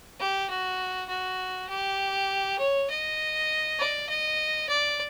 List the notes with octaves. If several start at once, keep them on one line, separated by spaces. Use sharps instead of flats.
G4
F#4
F#4
G4
C#5
D#5
D5
D#5
D5